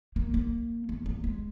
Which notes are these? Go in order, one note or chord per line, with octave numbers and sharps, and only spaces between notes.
A#3
A#3
A#3
A#3
G#3